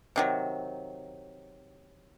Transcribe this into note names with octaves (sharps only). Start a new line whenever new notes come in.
C3 D#3 F#3